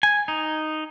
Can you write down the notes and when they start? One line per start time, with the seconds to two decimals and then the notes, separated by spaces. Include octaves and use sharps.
0.03 G#5
0.28 D#4